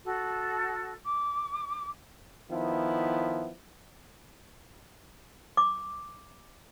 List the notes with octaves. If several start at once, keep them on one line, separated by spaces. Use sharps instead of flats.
F#4 A4
D6
D#3 F3 B3 E4
D6